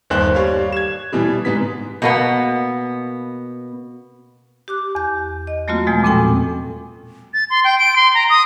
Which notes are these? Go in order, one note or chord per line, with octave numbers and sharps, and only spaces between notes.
G1 D#2 D#3 A#3 C5 F#6
G3 C#5 F5
G#6 E7
B2 E3 G3
G#2 B3 B6
B2 A#3 B3
G4 D6 F#6
E2 G6
D#5
F#3 A3 A#3 C4 F4 F#4
E2 B2 F3 G#3 A#3
A#2 C4 C#4 A4 G5 G#5
A6
C6
G5
D7
C6
A#5
D#6